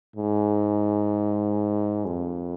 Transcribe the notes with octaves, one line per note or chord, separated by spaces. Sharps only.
G#2
F2